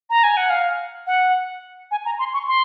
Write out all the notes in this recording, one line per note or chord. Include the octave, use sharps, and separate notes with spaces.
A#5
G#5
F#5
F5
F#5
G#5
A#5
C6
C#6
C6